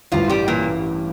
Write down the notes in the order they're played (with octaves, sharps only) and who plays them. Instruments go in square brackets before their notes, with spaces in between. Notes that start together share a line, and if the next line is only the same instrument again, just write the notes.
[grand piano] A1 G2 E3 [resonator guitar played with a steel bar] F3 F4
[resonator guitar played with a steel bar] G3 G4
[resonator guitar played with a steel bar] A#2 A#3 [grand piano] E3